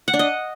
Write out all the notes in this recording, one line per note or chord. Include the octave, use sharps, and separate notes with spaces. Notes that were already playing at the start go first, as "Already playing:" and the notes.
F#5
D4
D#5